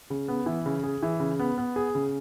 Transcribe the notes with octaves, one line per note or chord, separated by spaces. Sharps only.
C#3
B3
E3
C#3
G#4
E3
C#3
B3
B3
G#4
C#3